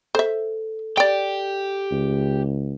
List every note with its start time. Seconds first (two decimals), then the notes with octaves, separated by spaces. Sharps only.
0.15 A4 C5 E5
0.97 G4 D5 G5
1.91 C#2